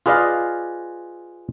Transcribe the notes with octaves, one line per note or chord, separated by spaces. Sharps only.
F4 G#4 B4 D5 D#5 F5